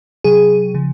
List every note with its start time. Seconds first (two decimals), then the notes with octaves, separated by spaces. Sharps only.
0.24 C3 F#3 G#4
0.74 C#3 F3